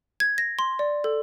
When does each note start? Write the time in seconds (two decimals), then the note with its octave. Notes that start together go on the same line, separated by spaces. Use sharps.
0.20 G#6
0.38 A#6
0.59 C6
0.79 D5
1.04 A4